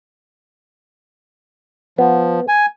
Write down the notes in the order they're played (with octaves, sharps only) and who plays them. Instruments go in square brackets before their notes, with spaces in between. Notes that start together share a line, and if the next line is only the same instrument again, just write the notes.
[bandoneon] F3 [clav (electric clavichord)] B3
[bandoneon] G#5